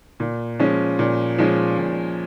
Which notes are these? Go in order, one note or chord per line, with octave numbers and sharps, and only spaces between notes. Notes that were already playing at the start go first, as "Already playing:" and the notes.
A#2
F3 G#3 C#4
A#2
F3 G#3 C#4
A#2